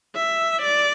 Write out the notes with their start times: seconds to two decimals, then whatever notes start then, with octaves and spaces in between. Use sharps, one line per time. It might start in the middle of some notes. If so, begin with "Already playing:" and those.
0.15 E5
0.62 D5